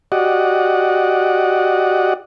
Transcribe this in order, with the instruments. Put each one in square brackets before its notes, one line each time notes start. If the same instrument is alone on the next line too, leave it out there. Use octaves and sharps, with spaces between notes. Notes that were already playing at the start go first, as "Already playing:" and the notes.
[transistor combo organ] F#4 G4 D5 D#5 F#5